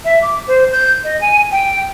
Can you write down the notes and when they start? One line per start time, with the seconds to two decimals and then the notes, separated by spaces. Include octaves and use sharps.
0.05 E5
0.22 D6
0.48 C5
0.72 G6
1.04 D#5
1.21 G#5
1.52 G5